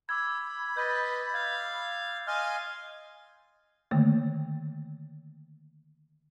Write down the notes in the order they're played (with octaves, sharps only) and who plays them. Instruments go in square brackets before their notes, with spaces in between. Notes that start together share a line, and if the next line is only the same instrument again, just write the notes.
[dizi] B5 [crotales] D6 E6 G#6
[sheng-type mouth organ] B4 D#5 [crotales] G6 A6
[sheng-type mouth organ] F5 [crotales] G#6
[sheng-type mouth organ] D#5 F5 C6 [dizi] G#5 [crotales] F6
[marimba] D3 D#3 A3 A#3